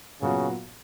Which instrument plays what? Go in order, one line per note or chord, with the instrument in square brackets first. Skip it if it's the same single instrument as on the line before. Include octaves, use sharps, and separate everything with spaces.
[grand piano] A#2 F#3 B3 F#4 [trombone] C#3